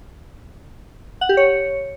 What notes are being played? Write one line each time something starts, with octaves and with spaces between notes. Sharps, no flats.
F#5
G4
C#5